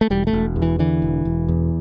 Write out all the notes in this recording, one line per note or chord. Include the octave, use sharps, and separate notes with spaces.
A3
E1 G3
A3
E1
E2
E3
D3 E3
E1
E1
E2